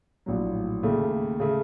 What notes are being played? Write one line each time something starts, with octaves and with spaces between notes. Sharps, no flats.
A#1 A2 F#3
D#2 C#3 A3
C#3 A3